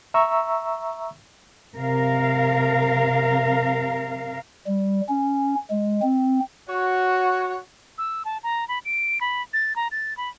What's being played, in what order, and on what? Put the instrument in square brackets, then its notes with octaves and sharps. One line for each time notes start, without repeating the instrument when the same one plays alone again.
[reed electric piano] E5 A#5 C#6 E6
[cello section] C3 A#4 F5
[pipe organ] G3
C#4
G#3
C4
[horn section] F#4 C#5
[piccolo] E6
A5
A#5
B5
D7
B5
A6
A#5
A6
B5